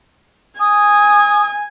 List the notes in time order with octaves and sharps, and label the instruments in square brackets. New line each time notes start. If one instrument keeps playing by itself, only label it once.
[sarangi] G#5 [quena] D#6